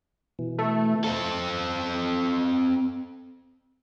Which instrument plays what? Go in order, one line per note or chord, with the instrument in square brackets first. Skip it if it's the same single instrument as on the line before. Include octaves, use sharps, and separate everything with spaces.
[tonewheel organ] B2 E3
[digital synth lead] A3
[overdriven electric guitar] C4 A4